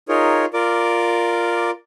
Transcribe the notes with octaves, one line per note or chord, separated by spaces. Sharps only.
D#4 F4 G#4 A#4 C#5
F4 A#4 D5 D6